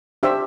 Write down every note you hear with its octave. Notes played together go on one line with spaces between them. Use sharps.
D4 G4 C5 E5